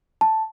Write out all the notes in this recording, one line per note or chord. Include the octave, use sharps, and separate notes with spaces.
A5